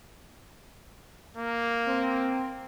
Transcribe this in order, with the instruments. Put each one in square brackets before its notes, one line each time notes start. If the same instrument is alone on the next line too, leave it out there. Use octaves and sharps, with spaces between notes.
[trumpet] A#3
[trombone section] C4